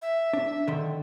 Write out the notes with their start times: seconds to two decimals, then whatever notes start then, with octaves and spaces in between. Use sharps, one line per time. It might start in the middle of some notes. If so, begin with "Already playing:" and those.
0.02 E5
0.33 D4
0.68 D3 D#3 C6